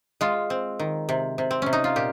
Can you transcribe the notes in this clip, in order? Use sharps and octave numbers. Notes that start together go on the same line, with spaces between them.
G#3 F4
C4
D#3
C3
C3
C4
C3 C#4
D#4
F4
A#2 G4